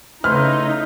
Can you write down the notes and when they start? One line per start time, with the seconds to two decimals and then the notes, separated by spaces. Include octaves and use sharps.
0.24 C#3 A3 D#4 E4 B4 C5 F6